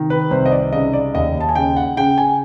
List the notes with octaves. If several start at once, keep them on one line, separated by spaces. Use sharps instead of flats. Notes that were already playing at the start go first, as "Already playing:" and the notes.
Already playing: C3 D#3
B4
C2 C5
D#5
D5
C#3 D#5
D5
D#2 D#5
A5
G#5
C#3 G5
F#5
C#3 G5
G#5